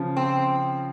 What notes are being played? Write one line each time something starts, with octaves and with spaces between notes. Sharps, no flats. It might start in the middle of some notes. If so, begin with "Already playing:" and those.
Already playing: C#3 F3
C4